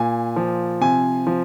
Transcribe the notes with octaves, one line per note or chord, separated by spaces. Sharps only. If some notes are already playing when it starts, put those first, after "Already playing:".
Already playing: A#2 G#5
F3
C3 G#5
F3